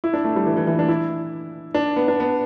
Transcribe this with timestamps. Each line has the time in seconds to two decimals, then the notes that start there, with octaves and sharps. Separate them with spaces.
0.04 E4
0.14 D4
0.24 A3
0.36 G3
0.46 E3
0.57 E3
0.67 E3
0.79 D4
0.89 E4
1.75 D4
1.96 B3
2.08 D4
2.20 B3